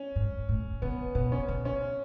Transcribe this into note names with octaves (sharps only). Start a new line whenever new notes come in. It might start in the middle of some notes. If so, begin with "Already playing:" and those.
Already playing: C#4
G#2
A2
C#3 B3
B2 B3
C#4
C#3
C#4